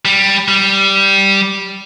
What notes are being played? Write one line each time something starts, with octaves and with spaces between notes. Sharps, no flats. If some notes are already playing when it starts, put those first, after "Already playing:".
G3
G3